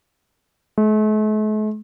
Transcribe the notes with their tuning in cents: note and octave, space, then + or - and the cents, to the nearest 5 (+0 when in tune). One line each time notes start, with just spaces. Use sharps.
A3 -45